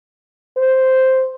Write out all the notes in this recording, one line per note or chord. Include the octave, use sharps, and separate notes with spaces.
C5